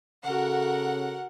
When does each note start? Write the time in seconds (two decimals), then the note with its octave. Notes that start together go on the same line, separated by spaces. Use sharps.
0.25 C#3 F#4 A4 A#4 F#5